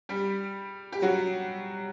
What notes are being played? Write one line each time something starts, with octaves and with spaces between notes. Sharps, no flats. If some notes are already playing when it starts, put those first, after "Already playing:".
G3 G4
G4
F#3 F#4